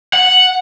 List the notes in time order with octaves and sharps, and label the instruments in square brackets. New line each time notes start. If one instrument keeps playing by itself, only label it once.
[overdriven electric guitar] F#5